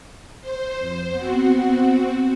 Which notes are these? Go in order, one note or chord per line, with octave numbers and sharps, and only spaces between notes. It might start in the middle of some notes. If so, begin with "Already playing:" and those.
C5
F2
B3 C4 F#4